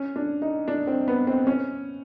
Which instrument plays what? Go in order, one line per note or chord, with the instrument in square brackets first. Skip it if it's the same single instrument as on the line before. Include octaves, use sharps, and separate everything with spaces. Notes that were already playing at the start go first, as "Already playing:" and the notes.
Already playing: [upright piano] C#4
D4
D#4
D4
C4
B3
C4
C#4